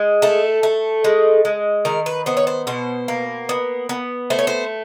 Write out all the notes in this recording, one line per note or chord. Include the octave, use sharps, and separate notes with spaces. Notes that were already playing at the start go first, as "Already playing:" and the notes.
Already playing: G#3
A3 A4
A3
G#3
G#3
D#3 A#4
B4
B3 C5
C#5
C5
B2 C5
A#3
B3
B3
A3 C5
C#5
C5